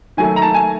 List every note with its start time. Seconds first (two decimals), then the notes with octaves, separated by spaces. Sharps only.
0.17 D#3 F#3 A3 G#5
0.36 A#5
0.42 A5
0.54 G#5